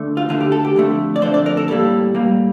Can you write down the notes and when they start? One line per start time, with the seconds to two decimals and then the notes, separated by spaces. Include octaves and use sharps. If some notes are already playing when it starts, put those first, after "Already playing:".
Already playing: D3 A3
0.17 F4
0.29 D2 D3 A3 F4
0.40 G4
0.52 A4
0.65 G4
0.76 F2 D3 A3
1.16 D5
1.22 F2 D3 A3 C5
1.34 D5
1.46 A#4
1.57 A4
1.68 A2 G3 A#3 A4
2.14 A2 G3 A#3